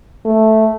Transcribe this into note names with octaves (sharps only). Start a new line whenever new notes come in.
A3